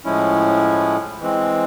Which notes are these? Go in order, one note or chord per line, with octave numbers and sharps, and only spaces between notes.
A2 F3 G#3 C#4 E4
E3 G#3 C4